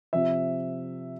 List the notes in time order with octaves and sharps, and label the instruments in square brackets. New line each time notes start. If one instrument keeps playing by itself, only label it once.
[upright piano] C3 F3 E5